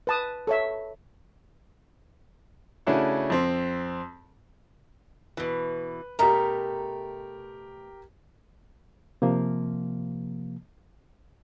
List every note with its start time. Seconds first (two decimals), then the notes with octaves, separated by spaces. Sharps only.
0.07 B4 A5 D#6
0.47 A4 C#5 E5
2.87 C#3 A3 C#4 D4 E4 F#4
3.30 F2 C4
5.37 B2 E3 B4
6.19 B2 A3 G4 A#4 A#5
9.22 C3 F3 A#3